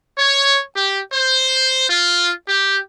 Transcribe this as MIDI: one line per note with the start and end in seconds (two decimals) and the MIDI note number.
0.18 0.59 73
0.76 0.99 67
1.13 1.87 72
1.90 2.31 65
2.48 2.79 67